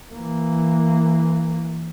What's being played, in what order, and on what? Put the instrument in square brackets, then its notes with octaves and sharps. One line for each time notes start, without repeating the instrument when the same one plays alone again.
[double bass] E3 A#3